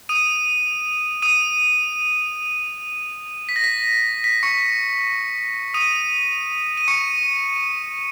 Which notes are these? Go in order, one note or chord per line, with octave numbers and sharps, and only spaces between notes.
D#6 D#7
D#6 D#7
B6
A#6
B6
B6
C#6 C#7
D#6 D#7
D#7
C#6 C#7